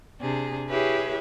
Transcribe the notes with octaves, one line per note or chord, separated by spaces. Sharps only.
C3 D4 G#4
E4 G4 G#4 B4 C#5 E5